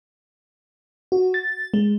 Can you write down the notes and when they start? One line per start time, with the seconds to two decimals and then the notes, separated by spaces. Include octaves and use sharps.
1.12 F#4
1.34 A6
1.74 G#3